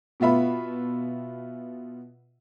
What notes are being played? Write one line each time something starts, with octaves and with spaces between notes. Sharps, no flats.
B2 B3 F4 E5 B5